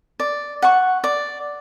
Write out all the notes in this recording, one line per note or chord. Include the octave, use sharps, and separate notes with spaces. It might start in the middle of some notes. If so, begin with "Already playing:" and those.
D5
F#5 C#6
D5